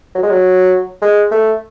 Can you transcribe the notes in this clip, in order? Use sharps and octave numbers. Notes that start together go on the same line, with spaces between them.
F#3
G#3
F#3
G#3
A3